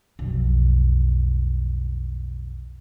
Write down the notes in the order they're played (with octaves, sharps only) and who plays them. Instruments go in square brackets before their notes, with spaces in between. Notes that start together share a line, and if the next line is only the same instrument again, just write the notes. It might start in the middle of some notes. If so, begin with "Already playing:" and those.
[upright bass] B1 F2